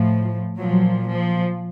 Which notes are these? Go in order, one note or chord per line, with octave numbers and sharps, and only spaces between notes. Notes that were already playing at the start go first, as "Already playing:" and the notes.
Already playing: A2 F3
A#2 F3 F#3
F3